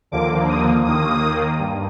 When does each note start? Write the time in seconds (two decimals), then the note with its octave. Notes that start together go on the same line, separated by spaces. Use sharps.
0.12 D#2 D3 F3 A#3 D6
0.49 D#6
0.85 D#2 D#3 A#3 D#6
1.59 G2